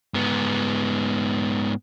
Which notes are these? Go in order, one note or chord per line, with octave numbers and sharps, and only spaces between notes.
G#2 B3